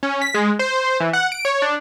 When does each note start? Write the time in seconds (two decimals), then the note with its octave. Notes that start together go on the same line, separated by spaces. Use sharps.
0.03 C#4
0.22 B6
0.34 G#3
0.59 C5
1.00 E3
1.13 F#5
1.32 D7
1.45 C#5
1.62 D4